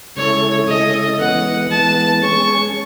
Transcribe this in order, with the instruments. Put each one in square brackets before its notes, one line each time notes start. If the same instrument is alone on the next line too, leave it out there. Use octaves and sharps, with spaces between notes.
[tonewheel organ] C#3 G#3 C#4 E4 A4 [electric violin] C#5
[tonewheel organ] C#3 G#3 C#4 E4 A4 [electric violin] D#5
[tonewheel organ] E3 G#3 B3 [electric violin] F#5
[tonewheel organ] E3 G#3 B3 [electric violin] A5
[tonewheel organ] G#3 C#4 G#4 [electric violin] C#6